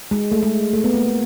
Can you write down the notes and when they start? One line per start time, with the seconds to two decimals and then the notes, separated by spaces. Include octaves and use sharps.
0.11 G#3
0.32 A3
0.42 G#3
0.73 A3
0.84 B3
0.94 A#3